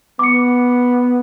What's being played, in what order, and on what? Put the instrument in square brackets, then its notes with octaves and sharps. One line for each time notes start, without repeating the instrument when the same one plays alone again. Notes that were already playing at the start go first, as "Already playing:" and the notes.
[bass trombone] B3 [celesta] D6 C#7